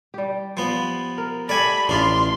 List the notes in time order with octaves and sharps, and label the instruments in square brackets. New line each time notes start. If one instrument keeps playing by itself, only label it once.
[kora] G3 G4
[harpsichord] F3 B3
[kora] A#4
[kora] A3 G4 [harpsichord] D5 G#5 [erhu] B5
[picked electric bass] A1 [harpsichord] D4 F4 [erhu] C6